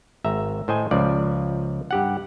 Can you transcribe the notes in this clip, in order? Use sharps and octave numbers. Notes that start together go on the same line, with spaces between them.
G#1 E5 A#5
A2 C5 D#5 G#5
C#2 F3 D5
G2 G4 F#5